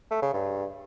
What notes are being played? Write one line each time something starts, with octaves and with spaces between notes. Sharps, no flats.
A3
C#3
G2